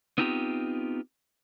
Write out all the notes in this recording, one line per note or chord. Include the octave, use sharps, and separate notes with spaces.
B3 C4 D#4 F4 G4